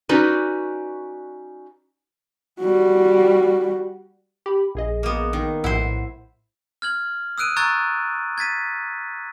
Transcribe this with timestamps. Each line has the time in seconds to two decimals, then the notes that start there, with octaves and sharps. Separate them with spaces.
0.09 C#4 D#4 F#4 B4 D5
2.60 G3 F#4
4.46 G4 B5
4.75 A#1 G#4 D#5
5.03 A#3 B3
5.33 D#3
5.64 A#1 A2 E4 C5 F#5
6.82 F6 G#6 F#7
7.38 D#6 E6 F#6 D7 D#7
7.56 A#5 C#6 E6 F#6 G#6 A6
8.38 G#6 A6 B6 D#7